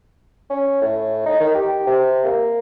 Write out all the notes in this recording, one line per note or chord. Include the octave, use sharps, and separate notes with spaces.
C#4
A2
D#4
D#3
G4
C3
A#3